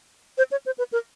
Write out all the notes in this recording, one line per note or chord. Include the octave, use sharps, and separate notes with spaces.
C5
C#5
C5
B4
A#4